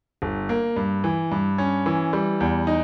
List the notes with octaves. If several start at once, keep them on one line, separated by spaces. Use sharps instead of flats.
G1
A#3
G2
E3
G2
C#4
E3
G3
E2
D#4